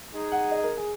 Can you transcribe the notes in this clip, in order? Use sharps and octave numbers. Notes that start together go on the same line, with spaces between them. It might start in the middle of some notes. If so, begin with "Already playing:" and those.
G#3 D#4 G#4
F#5
D#5
A#4
G#4